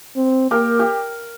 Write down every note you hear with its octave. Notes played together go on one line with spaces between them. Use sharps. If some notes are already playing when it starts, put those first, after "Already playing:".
C4
A#3 G4 A#4
G4